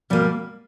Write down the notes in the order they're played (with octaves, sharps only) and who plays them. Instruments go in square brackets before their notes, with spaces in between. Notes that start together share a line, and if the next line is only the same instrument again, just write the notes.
[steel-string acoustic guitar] B2 G3 A#3